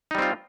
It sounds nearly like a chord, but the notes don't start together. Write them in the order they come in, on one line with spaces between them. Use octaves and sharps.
D#4 G3 C4 F4